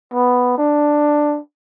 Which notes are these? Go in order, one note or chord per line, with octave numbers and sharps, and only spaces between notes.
B3
D4